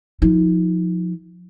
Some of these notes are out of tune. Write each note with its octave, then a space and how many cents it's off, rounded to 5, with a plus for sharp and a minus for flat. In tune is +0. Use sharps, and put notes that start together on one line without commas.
F3 +30 D#4 +35